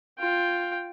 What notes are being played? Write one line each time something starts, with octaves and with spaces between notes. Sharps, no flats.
F4 G5